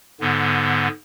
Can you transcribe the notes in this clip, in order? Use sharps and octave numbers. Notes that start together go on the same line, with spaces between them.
G#2 D3 B3